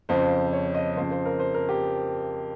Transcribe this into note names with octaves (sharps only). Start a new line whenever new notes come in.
F2 C#3 F3 C5
C#5
D#5
F2 C#3 F3 C5
C5
A#4
C5
A#4
G4